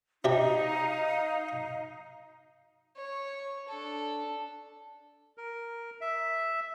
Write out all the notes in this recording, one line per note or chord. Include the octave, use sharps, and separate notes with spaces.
C3 D4 D#4 G4 F5
C#5
D4 A4
A#4
E5